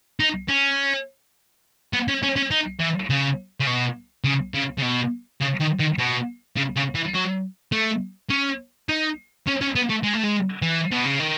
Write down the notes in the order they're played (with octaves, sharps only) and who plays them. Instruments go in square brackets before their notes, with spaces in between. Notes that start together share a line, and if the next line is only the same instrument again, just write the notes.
[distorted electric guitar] D#4
C#4
B3
C#4
C#4
C#4
D#4
E3
C#3
C#3
B2
C#3
C#3
C#3
B2
C#3
D#3
D#3
B2
C#3
C#3
E3
F#3
A3
C#4
D#4
C#4
C#4
B3
A3
G#3
A3
G#3
E3
B2
C#3
D#3